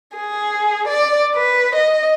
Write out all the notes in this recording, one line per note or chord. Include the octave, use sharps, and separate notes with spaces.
G#4
D5
B4
D#5